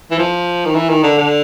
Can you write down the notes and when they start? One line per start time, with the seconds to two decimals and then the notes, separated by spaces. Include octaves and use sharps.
0.11 E3
0.19 F3
0.65 D#3
0.75 E3
0.89 D#3
1.03 D3
1.18 D3